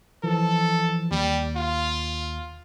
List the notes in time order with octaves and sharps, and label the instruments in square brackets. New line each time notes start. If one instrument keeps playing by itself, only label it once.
[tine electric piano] E3 F3 [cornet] A4
[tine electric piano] D#2 [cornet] G3
[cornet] F4